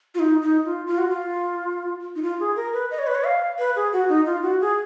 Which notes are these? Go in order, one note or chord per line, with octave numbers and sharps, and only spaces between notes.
F4
D#4
D#4
F4
F4
F#4
F4
D#4
F4
G#4
A#4
B4
D#5
C#5
B4
C#5
F5
B4
G#4
F#4
D#4
F4
F#4
G#4